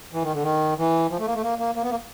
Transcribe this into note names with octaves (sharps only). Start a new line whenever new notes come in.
E3
D#3
D3
D#3
E3
F3
A3
A#3
A3
A#3
A#3
A#3
B3
A#3